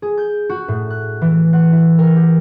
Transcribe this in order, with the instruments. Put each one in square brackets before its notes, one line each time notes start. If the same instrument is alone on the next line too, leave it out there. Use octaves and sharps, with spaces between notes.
[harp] G#4
G6
F#4
A2
F#6
E3
F#5
E4
A#4
G4